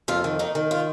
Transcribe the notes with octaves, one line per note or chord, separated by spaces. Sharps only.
F2 F4
D#3
D#3 D#4
D#3
F4